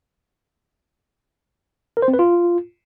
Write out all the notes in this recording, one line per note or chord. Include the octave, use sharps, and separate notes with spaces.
A#4
C5
C4
B4
F4